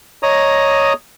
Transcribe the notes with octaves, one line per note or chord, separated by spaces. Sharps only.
C#5 D#5 A#5 D#6